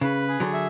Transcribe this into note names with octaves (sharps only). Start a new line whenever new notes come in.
C#3 B4
G#4
D3 F#3
E5